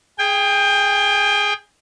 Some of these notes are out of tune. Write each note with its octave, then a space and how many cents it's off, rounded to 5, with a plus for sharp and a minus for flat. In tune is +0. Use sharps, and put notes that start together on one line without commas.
G#4 +0 G5 +25